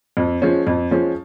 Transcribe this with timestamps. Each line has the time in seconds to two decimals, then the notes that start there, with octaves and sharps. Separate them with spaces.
0.17 F2
0.42 F3 G#3 C#4
0.67 F2
0.91 F3 G#3 C#4